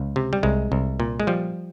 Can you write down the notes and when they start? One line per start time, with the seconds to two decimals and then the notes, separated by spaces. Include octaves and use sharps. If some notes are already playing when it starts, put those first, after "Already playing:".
Already playing: C#2
0.16 C3
0.33 G3
0.43 C2 G#3
0.72 C2
1.00 A#2
1.20 G#3
1.27 F3 G3